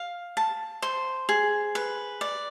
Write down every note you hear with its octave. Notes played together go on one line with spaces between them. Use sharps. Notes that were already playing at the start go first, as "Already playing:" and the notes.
Already playing: F5
A5
C5
G#4
B4
D5